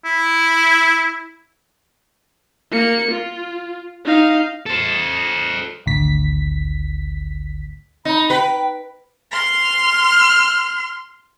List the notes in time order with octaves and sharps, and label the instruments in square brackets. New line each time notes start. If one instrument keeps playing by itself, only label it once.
[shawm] E4
[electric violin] A#3 C#7
F4
D#4 F5
[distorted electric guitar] A4 C5
[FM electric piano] G#1 D2 B6
[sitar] D#4 [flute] B5
[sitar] B4 [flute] G5
[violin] C6 F6